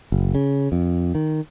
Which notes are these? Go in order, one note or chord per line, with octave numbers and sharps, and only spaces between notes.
F#1
C#3
F2
D#3